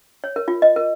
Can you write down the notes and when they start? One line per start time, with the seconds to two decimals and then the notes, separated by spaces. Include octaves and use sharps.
0.24 C#5
0.36 A#4
0.48 F4
0.62 D#5
0.76 A#4